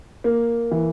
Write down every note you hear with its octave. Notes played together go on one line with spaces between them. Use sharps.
A#3
E3